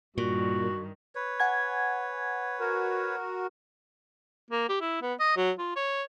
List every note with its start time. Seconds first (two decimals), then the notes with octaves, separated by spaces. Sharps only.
0.18 G2 A#2 D#3 F#4
1.15 B4 C#5
1.40 F#5 G#5 G#6
2.60 F#4 A#4
4.51 A#3
4.69 G4
4.81 E4
5.02 B3
5.20 D#5
5.37 F#3
5.59 F4
5.76 C#5